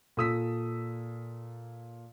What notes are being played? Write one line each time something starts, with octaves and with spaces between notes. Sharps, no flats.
A#2 A4 D#6 E6 B6